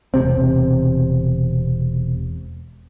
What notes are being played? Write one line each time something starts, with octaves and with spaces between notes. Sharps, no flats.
E1 C#2 C3 C4